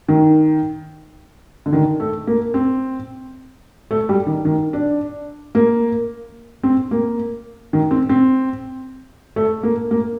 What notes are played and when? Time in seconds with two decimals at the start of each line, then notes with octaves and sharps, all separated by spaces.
0.08 D#3
1.66 D3
1.73 D#3
2.00 A3
2.27 A#3
2.54 C4
3.91 A3
4.09 G3
4.27 D#3
4.45 D#3
4.73 D4
5.55 A#3
6.63 C4
6.91 A#3
7.73 D#3
7.91 C4
8.09 C4
9.36 A3
9.63 A#3
9.91 A#3